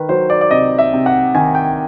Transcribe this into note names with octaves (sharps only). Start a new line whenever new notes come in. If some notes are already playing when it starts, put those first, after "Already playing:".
Already playing: D#3 B4
F#3 C5
D5
D5
C3 D#5
E5
C3
F#5
D#3 G#5
G5